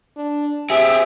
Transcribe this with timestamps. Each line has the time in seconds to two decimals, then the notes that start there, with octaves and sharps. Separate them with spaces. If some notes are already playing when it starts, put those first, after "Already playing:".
0.16 D4
0.70 C4 G4 G#4 E5